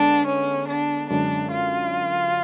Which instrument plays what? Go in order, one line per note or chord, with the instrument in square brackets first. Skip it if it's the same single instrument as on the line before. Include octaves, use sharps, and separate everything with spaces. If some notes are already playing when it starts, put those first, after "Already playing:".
Already playing: [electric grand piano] D3 G#3 B3 [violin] D4
[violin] C#4
D4
[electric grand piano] F#2 D3 G#3 C#4 [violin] D4
[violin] F4